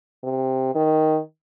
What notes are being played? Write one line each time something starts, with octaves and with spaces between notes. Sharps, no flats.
C3
D#3